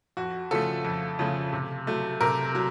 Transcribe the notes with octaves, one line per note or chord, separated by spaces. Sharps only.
F2 F#4
C#3 F3 A3 A4
F2
C#3 F3 A3
C3
F#3 A3
C3 A#4
F#3